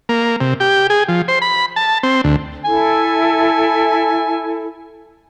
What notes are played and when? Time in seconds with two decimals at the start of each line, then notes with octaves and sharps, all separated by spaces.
0.09 A#3
0.41 C3
0.60 G4
0.90 G#4
1.08 F3
1.28 C5
1.42 B5
1.76 A5
2.03 C4
2.24 D2
2.65 E4 A4 G#5